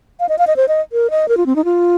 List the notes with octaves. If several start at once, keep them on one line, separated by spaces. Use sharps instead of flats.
F5
D#5
F5
D#5
C5
D#5
A#4
D#5
A#4
F4
C4
D#4
F4